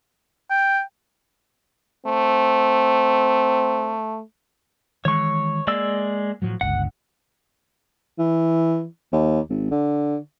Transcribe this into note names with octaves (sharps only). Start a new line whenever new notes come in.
G5
A3 C4
D#3 E3 G#3 C#5 C#6
G#3 A#3 D5 E6
A2 F3 F#3
G1 C#2 F#5
E3
D#2
G#1
D3